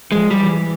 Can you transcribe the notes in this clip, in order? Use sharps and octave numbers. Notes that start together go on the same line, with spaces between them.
F3 G#3
G3
E3